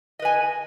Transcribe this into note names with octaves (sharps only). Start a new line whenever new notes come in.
B4 D#5 G#5